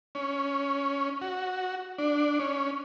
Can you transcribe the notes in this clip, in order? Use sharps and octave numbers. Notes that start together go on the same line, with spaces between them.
C#4
F#4
D4
C#4